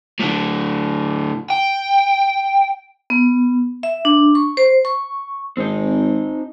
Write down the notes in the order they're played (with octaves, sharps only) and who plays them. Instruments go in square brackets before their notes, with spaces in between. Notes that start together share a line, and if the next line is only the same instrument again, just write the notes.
[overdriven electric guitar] A2 D3
G5
[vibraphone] B3
E5
D4
C#6
C5
C#6
[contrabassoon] G#1 [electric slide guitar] C4 D#4